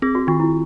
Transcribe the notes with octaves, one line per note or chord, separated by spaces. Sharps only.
C4 G#4
F#4
D#3 F4
E4